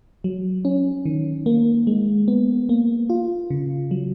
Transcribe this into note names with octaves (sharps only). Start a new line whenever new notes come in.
F#3
C#4
D#3
A#3
G#3
B3
A#3
F4
C#3
F#3